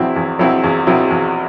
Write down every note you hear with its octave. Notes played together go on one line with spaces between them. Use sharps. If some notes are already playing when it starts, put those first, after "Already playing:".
Already playing: E2 B2 F#3 C4 E4
E2
B2 F#3 C4 E4
E2
B2 F#3 C4 E4
E2